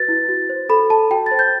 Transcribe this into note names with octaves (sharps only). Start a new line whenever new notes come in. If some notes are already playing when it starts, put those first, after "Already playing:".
Already playing: F#4 B4 A6
E4
F#4
C5
A4 B5
A4 A5
F#4 G5
C5 A6
G6